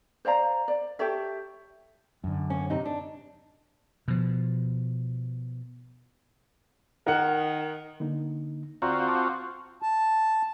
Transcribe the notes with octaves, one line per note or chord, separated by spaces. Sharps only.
C5 D5 F5 A#5
D5
G4 A4 C#5 E5
F#2 D3
A#3 C#4
C3 D#4
D4
B2 F3
D#3 A#4 F#5
D3 A#3 D#4
D2 C4 F4 F#4 D5 A#5
A5 D6
A5